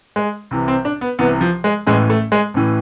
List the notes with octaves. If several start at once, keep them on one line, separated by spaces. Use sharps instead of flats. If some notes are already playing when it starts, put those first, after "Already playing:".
G#3
C2 C3 E3
C4
D4
B3
C2 C3 E3 B3
F3
G#3
A1 A2 E3 G#3
A3
G#3
A1 A2 E3